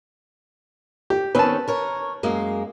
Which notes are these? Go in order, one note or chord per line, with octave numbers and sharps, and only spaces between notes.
G4
D#3 C4 C#4 B4 A5
A#4 C#5
F#2 G#3 A#3